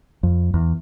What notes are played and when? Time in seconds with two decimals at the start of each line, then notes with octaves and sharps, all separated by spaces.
0.23 F2
0.54 E2